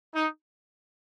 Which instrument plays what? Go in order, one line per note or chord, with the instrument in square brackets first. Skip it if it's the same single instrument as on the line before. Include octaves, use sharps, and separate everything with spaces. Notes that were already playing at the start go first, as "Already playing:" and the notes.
[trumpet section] D#4